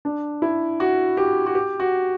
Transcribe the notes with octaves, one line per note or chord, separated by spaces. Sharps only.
D4
E4
F#4
G4
F#4
G4
F#4